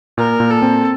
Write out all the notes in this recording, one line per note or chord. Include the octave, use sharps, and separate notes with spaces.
A#2 A#4
A#2
A4
C4